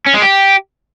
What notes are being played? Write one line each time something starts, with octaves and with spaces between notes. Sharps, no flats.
C#4
G#3
G4